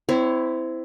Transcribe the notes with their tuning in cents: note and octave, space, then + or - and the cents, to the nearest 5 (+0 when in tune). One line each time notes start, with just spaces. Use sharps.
C4 -25 E4 +0 C#5 +15